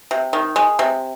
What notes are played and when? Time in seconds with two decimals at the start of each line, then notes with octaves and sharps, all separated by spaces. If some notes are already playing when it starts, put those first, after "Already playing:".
0.11 C3
0.33 D#3
0.56 G#3
0.79 C3